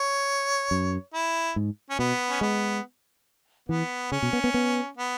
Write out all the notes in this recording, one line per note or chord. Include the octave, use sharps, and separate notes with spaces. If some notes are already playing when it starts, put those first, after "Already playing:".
Already playing: C#5
F#2
E4
G#2
C#4
B2 B3
C#4
G#3 B3
E3 B3
C#3 C#4
B2
B3
B3
B3
B3